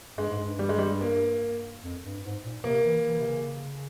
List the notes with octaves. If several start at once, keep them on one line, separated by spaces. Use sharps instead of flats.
G2 G#3
G#2
G2
G3
G#3
G3
A#3
F2
G2
G#2
A#2
C3 A#3
E3
E3
C3
C#3